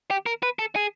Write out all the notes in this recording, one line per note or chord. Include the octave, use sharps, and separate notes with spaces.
G4
A#4
B4
A4
G#4